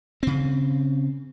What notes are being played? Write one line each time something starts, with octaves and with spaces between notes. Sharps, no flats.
C#3 C4